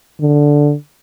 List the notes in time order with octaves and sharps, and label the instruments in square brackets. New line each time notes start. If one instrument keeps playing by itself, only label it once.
[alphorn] D3